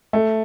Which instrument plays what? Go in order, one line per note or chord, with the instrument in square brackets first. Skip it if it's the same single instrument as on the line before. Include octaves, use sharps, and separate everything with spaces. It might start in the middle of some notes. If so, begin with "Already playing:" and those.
[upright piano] A3